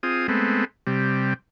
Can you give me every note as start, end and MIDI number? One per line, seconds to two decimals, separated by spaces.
0.03 0.27 60
0.03 0.27 65
0.03 0.27 68
0.03 0.27 87
0.28 0.65 56
0.28 0.65 57
0.28 0.65 59
0.28 0.65 60
0.87 1.34 48
0.87 1.34 55